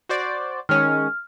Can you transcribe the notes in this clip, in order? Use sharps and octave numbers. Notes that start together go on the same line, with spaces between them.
F#4 C5 D5
D#3 G#3 C#4 F6